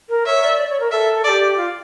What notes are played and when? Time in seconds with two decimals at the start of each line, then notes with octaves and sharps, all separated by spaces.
0.09 A#4
0.26 C#5 E5
0.43 D5
0.59 D5
0.69 C#5
0.80 A#4
0.91 A4 E5
1.24 A4 D5
1.28 G4
1.57 F4